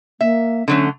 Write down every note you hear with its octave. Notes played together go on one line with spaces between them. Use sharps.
A#3 E5
D3 F#3 A3 C#4